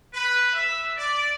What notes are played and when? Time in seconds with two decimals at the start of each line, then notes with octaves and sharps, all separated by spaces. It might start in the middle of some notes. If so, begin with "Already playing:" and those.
0.14 B4
0.53 E5
0.96 D5